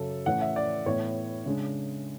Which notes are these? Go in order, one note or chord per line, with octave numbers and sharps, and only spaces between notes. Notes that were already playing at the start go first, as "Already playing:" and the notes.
Already playing: F#2 C#3 F#3 A4
A2 E3 A3 C#4 F#5
E5
D5
A2 E3 B3 C#5
C#3 G#3 D4